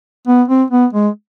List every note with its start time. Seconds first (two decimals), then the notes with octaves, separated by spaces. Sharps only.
0.27 B3
0.48 C4
0.70 B3
0.93 G#3